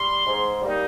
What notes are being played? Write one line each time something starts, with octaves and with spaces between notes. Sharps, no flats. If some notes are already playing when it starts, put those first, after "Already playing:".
Already playing: G3 C6
G#2
G3 A#3 D#4